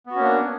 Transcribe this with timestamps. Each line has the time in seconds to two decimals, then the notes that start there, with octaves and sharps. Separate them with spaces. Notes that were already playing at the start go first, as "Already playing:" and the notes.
0.06 B3
0.11 F#4
0.15 C#4
0.20 A#3
0.24 D4